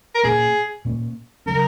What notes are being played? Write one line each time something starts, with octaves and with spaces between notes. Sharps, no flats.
A#4
A#2 A#3 C#4 G#4
A#2 A#3 C#4
C#3 F#3 C#4 A#4